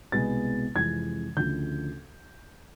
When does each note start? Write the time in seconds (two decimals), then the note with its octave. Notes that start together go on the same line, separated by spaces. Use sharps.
0.12 C2 B2 G#3 B3 A6
0.75 F2 C3 E3 G#3 G#6
1.37 D2 C#3 F3 G6